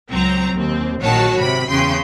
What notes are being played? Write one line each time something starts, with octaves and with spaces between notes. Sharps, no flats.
C#2 F#3 C4 A#5
D#2 C4
A#1 D#3 F#3 F#4 C#5 A5
G#1 C3 B5
E2 C#3 G5 C6